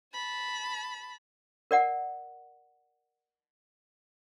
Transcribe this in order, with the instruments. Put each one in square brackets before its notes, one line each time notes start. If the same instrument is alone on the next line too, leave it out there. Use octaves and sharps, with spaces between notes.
[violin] A5 B5
[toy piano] A#4 D5 F#5